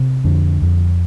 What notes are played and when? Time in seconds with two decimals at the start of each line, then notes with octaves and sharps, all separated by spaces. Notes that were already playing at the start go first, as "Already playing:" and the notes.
Already playing: C3
0.24 F2 D3
0.62 F2